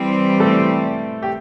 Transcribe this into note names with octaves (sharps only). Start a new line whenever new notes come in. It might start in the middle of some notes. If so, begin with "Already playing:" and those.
Already playing: E3 G3 C4
A3 A4
G4